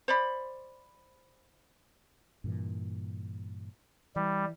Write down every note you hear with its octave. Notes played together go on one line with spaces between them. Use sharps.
C5 D5 B5
G2 A#2 E3
E3 G3